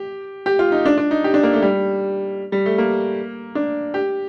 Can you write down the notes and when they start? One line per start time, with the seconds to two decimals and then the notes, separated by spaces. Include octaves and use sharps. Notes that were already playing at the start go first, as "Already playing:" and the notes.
Already playing: G4
0.46 G4
0.59 F4
0.72 D#4
0.86 D4
0.98 D4
1.11 D#4
1.24 G4
1.34 D4
1.43 A#3
1.53 A3
1.62 G3
2.52 G3
2.66 A3
2.78 A#3
3.55 D4
3.94 G4